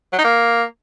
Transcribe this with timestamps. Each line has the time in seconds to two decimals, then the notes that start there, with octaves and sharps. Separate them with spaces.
0.12 F#3
0.18 D#4
0.24 A#3